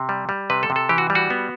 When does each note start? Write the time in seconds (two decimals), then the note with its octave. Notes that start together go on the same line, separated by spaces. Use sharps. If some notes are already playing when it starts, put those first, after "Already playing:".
Already playing: C3
0.09 G3
0.29 G3
0.50 C3 B4
0.63 A4
0.70 C3
0.76 A4
0.89 E3 G4
0.98 F#4
1.10 G3
1.15 F#4
1.30 B3